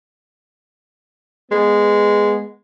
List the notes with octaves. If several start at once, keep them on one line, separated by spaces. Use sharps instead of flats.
G#3 B3